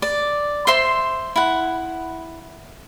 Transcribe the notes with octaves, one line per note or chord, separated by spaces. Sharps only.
D5
C5 E5 C6
E4 F#5